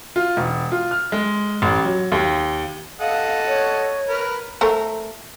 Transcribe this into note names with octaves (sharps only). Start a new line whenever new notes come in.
F4
E1
F4
F6
G#3
A1
F#3
D#2
A4 D#5 F5 F#5
C#5
A#4 B4
A3 A#4 C5